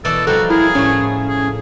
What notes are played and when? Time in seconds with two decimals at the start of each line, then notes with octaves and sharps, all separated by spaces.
0.05 B2 E3 A4 D5
0.27 F3 G3 D#4 F#4 A4
0.50 E4 G#4 A#4
0.75 A2 A3 C#4
1.28 G#4